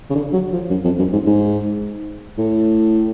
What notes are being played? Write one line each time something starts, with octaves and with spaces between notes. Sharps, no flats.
C#3
D3
F#3
F3
F#2
F2
F#2
G#2
G#2
A2